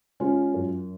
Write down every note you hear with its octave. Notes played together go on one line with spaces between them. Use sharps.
G#3 C#4 F4
F#2